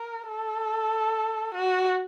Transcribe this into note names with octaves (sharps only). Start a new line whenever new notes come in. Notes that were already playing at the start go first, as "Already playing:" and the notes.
Already playing: A#4
A4
F#4